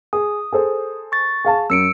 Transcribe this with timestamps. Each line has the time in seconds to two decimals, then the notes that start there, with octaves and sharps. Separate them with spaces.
0.13 G#4 D#6
0.53 G#4 A4 C5
1.12 C#6 A6
1.45 G#4 F5 A5
1.70 F#2 E6 C#7 D7